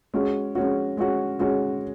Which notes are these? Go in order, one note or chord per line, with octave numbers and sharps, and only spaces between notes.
G#3 C#4 F#4
G#3 C#4 F#4
G#3 C#4 F#4
G#3 C#4 F#4